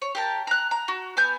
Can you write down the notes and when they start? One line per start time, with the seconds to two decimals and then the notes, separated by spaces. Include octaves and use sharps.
0.02 C#5
0.15 G4 A#4 A5
0.47 A#5 F#6
0.71 A#5
0.88 F#4
1.17 B3 G#5 G6